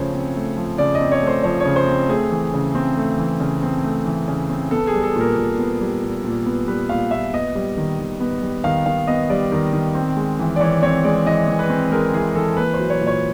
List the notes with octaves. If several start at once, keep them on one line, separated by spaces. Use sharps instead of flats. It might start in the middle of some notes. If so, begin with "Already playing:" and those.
Already playing: C#3 F3 A3 C5 C#5
C4
A3
F3
C#3 D5
D#5
C4
C#5
A3
C5
F3 C#5
C#5
C#3
C5
C4
A3 G#4
E3
C#3
C4
A3
E3
C#3
C4
A3
E3
C#3
C4
B3 A4
G#4
G3
A4
A#2
A#4
A#2
B3
G3
A#2
A#2
B3
G3 B4
A#2 F5
A#2 E5
B3 D#5
G3
D#3
D#3
B3
G3
D#3 F5
D#3 F5
B3 D#5
G3 D5
D#3
D#3
C4
G#3
E3
D5
E3 C#5
C4 C#5
G#3 D5
E3 D#5
E3
B4
C4
G#3 A#4
E3 G#4
E3 A4
A#3 B4
C5
F#3
C#5
A#2
C#5